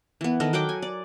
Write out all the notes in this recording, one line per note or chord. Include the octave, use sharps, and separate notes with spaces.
E3 B3
D#3 A4 A#4 D#5
F#3 F#5 G5 D6
G#5
D5